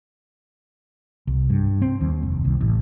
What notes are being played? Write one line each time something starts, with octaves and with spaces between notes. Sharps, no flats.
C2
G2
C4
D#2
F1
C2
A1